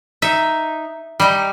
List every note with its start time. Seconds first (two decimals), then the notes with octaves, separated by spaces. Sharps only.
0.22 D#4 E5
1.20 G3 D#4 D#5